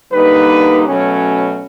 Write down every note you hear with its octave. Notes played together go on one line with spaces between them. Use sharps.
D3 G3 A#3 D#4 B4
B2 F#3 A3 C#4